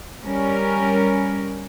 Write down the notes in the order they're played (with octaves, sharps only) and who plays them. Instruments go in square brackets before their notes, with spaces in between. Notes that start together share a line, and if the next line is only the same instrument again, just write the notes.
[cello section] G3 C#4 A#4